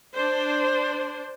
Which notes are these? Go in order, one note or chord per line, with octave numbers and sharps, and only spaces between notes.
D4 C5